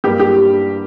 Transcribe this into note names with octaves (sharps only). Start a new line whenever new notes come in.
G2 G3 A#3 G4
G4